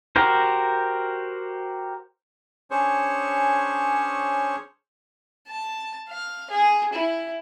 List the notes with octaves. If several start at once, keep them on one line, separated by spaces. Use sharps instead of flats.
F#4 G4 A#4 C5
C#4 D4 G#4 C5 C#5
A5
F5
G#4
E4